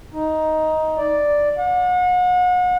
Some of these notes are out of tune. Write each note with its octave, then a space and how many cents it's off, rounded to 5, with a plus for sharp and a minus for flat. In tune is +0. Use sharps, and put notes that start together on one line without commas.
D#4 +10
D5 +0
F#5 -35